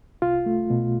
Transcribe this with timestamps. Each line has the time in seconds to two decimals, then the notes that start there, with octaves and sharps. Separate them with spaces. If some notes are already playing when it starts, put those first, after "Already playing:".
0.22 C2 F4
0.46 A3
0.70 B2